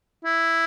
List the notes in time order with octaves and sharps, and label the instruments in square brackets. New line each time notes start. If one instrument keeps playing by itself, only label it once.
[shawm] E4